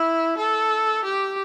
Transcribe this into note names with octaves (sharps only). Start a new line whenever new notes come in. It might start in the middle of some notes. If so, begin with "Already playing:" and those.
Already playing: E4
A4
G4